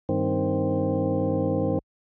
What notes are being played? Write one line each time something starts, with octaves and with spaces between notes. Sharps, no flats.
G2 D#3 C4